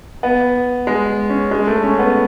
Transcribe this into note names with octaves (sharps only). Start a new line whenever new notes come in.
B3
G#3
C#4
G#3
A3
C#4
B3